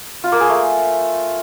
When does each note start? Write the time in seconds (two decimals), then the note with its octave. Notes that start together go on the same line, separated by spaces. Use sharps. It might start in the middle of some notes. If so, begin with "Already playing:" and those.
0.24 F4
0.32 A#3
0.40 G#4
0.49 A3